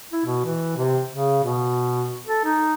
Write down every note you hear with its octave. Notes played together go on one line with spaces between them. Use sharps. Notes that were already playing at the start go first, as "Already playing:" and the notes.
E4
B2
E3
C3
C#3
B2
A4
D#4